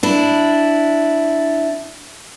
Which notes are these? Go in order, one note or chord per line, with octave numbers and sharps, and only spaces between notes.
D4 E4